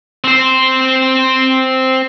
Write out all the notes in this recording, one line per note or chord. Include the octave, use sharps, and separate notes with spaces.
C4 C5